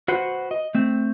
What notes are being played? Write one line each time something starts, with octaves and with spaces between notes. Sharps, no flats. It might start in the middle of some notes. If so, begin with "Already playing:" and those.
F#4 B4 C5 F#5
D#5
A3 C4